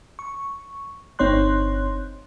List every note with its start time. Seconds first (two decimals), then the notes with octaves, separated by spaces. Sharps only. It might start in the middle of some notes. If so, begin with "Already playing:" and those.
0.19 C#6
1.19 G1 C4 D#4 C#5 C6 F#6